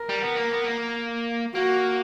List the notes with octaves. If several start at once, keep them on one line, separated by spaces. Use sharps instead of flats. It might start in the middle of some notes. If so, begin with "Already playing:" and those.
Already playing: A#4
G3
B3
A#3
B3
A#3
A#3 F#4